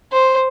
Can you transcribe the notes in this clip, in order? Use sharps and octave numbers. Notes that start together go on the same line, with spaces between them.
C5